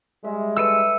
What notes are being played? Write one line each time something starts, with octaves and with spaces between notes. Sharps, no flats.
G3 G#3 E5
A4 B4 E5 E6 C#7 D#7